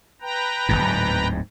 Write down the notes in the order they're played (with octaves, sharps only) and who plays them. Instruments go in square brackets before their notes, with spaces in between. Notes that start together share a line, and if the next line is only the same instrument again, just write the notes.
[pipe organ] B4 G5 A#5
[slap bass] D1 G1 G#2